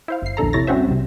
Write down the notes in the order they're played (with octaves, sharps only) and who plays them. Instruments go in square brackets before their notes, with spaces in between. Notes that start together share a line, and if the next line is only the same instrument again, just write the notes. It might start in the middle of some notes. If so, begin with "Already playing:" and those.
[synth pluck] E4 C5 F5
G1 C7
A#1 E2 D3 A4 A#5
C3 E4 C#5 A6 A#6
G3 C4 C#4 F#4 C5 E5
C2 C3